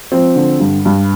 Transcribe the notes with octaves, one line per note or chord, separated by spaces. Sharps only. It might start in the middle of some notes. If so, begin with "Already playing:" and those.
F3 C4
D3
G2
G2